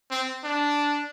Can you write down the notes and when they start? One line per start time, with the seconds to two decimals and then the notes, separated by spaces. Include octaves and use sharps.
0.11 C4
0.44 D4